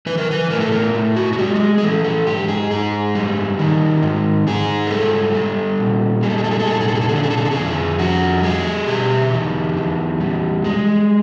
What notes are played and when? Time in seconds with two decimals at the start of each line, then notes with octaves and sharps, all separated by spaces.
0.06 E3 B4
0.18 A#4
0.31 B4
0.50 A2 A#4
0.61 A4
0.72 A#4
0.94 A2
1.16 F#4
1.33 F#4
1.38 G#3 G4
1.56 G4
1.60 G#4
1.78 G#4
1.83 E3 A4
2.04 A4
2.26 G#2 G4
2.48 G#4
2.71 G#2 G#4
3.15 G3
3.59 D#3
4.02 G#2
4.47 G#2 G#4
4.87 A#4
4.90 G3 A4
5.35 G3
5.79 A#2
6.23 G3 G#4
6.30 A4
6.38 G#4
6.44 A4
6.51 G#4
6.60 A4
6.66 A#2 G#4
6.73 A4
6.81 G#4
6.88 A4
6.95 G#4
7.01 A4
7.09 G#4
7.12 D3 A4
7.23 G#4
7.30 A4
7.37 G#4
7.45 A4
7.51 F2 G#4
7.99 F2 F#4
8.43 G3 G#4
8.87 B2 G4
9.32 E2
9.77 E2
10.20 G3
10.64 G#3